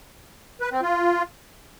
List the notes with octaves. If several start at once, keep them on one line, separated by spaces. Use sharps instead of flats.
B4
C4
F4